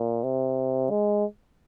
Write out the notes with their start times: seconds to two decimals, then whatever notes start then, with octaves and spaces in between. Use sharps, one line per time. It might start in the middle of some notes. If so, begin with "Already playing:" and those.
Already playing: A#2
0.23 C3
0.90 G#3